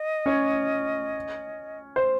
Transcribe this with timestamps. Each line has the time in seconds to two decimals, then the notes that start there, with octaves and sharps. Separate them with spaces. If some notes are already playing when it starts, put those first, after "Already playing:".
Already playing: D#5
0.26 C#4 C#5
1.96 C5